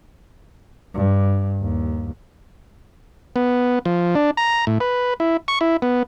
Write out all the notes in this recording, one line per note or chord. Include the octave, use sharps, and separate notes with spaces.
G2
D#2
B3
F3
D4
A#5
A2
B4
E4
C#6
E4
B3